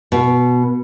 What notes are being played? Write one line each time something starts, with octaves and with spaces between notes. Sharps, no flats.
B2